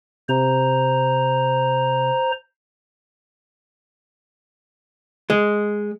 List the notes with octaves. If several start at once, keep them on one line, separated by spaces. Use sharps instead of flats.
C3 C5 A#5
G#3